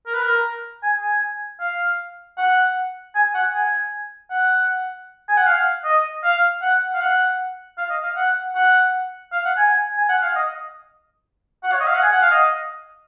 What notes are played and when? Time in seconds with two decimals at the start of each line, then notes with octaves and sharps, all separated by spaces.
0.06 A#4
0.14 B4
0.22 A#4
0.83 G#5
0.99 G#5
1.60 F5
2.38 F#5
3.15 G#5
3.34 F#5
3.54 G#5
4.30 F#5
5.29 G#5
5.37 F#5
5.46 F5
5.85 D#5
6.24 F5
6.62 F#5
6.94 F5
7.01 F#5
7.78 F5
7.90 D#5
8.03 F5
8.16 F#5
8.55 F#5
9.32 F5
9.45 F#5
9.57 G#5
9.98 G#5
10.09 F#5
10.22 F5
10.36 D#5
11.64 F#5
11.72 C#5
11.80 D#5
11.87 F5
11.95 F#5
12.03 G#5
12.12 F#5
12.21 F5
12.31 D#5